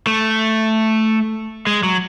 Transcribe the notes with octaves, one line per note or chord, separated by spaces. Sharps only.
A3
G#3
F#3